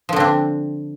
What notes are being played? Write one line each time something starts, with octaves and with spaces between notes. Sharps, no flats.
D3 F3 C4 D4